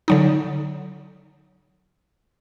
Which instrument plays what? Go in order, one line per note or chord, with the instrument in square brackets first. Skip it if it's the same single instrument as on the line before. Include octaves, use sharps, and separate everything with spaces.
[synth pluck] D3 F#3 D#4